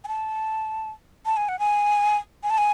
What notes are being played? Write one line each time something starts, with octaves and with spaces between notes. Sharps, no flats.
G#5
A5
A5
G#5
F#5
G#5
G#5
A5
G#5